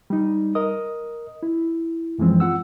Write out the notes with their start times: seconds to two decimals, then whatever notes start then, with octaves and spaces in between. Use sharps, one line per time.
0.10 G3 D#4
0.55 A#4 D#5 D#6
1.43 E4
2.18 F#2 E3 F3 G#3 C4
2.40 F4 F#5 E6